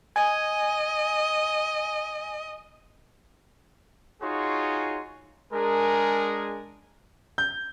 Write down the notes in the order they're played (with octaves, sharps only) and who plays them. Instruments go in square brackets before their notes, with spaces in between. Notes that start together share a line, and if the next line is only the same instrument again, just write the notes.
[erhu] D#5 [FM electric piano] G#5
[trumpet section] D#4 F4 F#4 G#4 C#5 C6
G#3 D4 G#4 A#4
[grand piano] G6